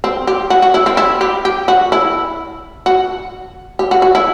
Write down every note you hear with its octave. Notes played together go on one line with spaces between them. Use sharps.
C4
G4
F#4
F#4
E4
C4
E4
G4
G4
F#4
E4
F#4
G4
F#4
F#4
E4